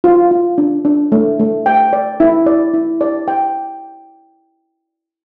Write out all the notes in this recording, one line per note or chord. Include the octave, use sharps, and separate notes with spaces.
F4
F4
D4
D4
A3
A3
G5
D5
E4
D5
E4
D5
G5